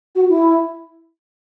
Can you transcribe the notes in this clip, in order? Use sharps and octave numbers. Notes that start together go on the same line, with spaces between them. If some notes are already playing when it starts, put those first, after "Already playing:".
F#4
E4